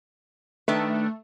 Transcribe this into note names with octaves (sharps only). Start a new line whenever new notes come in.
D#3 A3 D4 B4